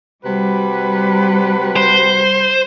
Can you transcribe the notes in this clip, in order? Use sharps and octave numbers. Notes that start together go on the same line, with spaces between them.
C3 G3 F#4 B4
C5